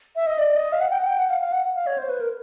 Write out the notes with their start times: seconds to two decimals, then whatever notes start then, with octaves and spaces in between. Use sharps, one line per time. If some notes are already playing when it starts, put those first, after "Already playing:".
0.16 E5
0.26 D#5
0.38 D5
0.56 D#5
0.72 F5
0.80 F#5
0.90 G5
0.98 F#5
1.07 G5
1.18 F#5
1.30 F5
1.41 F5
1.52 F#5
1.75 F5
1.86 C#5
1.98 C5
2.09 B4
2.20 A#4